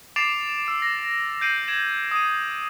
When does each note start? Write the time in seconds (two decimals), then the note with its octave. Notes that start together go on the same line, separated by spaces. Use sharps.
0.16 D6 A6 C7 D7 E7 F7
0.67 E6 D7
0.82 A#6
1.41 G6 A#6 C7 D7 D#7 F#7
1.68 G#6 D7 E7 F#7
2.11 D#6 D#7